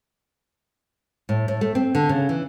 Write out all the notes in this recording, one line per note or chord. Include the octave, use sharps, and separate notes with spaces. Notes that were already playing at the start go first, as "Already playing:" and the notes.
A2
A2
A3
C4
D3
C#3
E3